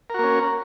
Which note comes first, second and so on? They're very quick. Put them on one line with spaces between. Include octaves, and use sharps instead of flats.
A#4 F#4 A#3 C#4